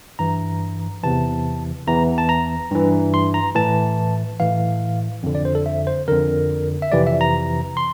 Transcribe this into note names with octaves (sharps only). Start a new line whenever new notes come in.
G2 E3 A#5
E2 C3 E3 A5
E2 E3 A#5
A5
A#5
G2 E3
C6
A#5
A2 E3 A5
A2 E3 F5
F2 D3
D5
C5
A4
E5
C5
F2 D3 A#4
E5
F2 C3 E3 D5
E5
A#5
C6